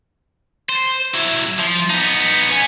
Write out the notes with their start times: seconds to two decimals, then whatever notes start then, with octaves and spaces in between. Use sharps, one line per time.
0.69 C5
1.14 F#3 E4
1.59 F3
1.90 B3 D#4
2.51 C#5 G#5